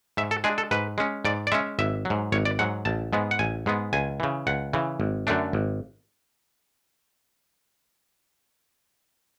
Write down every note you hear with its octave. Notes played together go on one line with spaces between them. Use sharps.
G#2 E5
A4
G#3 D4 G#4
A4
G#2 B4
G#3 C#4
G#2 D5
D5
G#3 C#4 E5
G#1 E5
F#3
G#2
G#1 C#5
D5
G#2 F#3 F#5
A1 A5
G#2 G#3 B3
F#5
A1 G#5
G#2 G#3 B3
C#2 G#5
C#3 E3
C#2 F#5
C#3 E3
G#1
F#2 D3 A3 D4
G#1